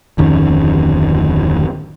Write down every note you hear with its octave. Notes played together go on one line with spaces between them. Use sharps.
D1 F2 D#3 C#4